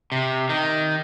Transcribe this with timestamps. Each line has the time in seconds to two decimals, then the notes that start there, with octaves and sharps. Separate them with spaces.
0.12 C3
0.49 D#3